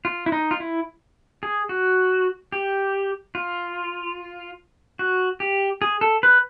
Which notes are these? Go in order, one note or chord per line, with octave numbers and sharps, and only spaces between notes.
F4
E4
D#4
F4
E4
G#4
F#4
G4
F4
F#4
G4
G#4
A4
B4